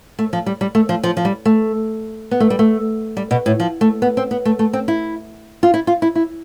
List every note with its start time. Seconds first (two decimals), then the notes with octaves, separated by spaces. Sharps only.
0.19 A3
0.33 F3
0.46 G3
0.61 G3
0.75 A3
0.89 F3
1.03 F3
1.17 F3
1.25 G3
1.45 A3
2.31 B3
2.40 A3
2.50 G3
2.59 A3
3.17 G3
3.31 B2
3.46 A2
3.60 F3
3.81 A3
4.02 B3
4.17 C4
4.31 B3
4.45 A3
4.59 A3
4.73 C4
4.88 E4
5.63 F4
5.74 E4
5.87 F4
6.02 E4
6.15 E4